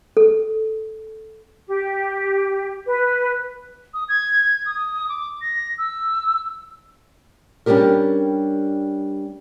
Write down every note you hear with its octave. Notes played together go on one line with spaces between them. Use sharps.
A4
G4
B4
D#6
G#6
D#6
D6
A#6
E6
G3 C#4 D4 G4 A#4